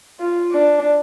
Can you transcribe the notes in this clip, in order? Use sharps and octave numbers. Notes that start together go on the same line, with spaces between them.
F4
D4